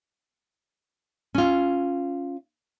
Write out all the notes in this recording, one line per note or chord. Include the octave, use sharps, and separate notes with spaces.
C#4 F4